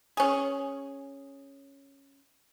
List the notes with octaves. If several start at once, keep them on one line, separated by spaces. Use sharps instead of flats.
C#4 G#4